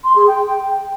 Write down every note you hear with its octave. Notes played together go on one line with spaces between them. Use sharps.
C6
G#4
G5